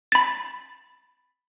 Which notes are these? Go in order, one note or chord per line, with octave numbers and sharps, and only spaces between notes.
B5 A6